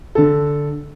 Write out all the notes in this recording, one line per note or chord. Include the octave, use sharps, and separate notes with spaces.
D3 A4